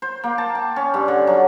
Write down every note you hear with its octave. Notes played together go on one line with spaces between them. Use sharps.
C5
A#3
A5
G5
C#4
G2
D3
F#3